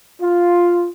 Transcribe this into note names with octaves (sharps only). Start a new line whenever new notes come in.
F4